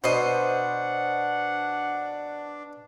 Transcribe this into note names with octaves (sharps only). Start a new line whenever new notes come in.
B2 D4 C5 D#5 F#5